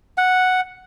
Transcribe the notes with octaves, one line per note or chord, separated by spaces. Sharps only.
F#5